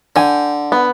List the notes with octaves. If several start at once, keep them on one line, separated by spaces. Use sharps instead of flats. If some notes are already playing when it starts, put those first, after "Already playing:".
D3 G5 G#5
B3